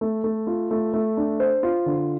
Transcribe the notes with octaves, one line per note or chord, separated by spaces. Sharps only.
A3
A3
F4
A3
A3
D4
C5
F4
D3